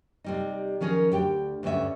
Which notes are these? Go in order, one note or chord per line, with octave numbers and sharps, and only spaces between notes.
C3 G3 D#4
D#3 F3 C#4 G#4 A#4
D2 G4 G5
D2 G2 D3 C#4 E5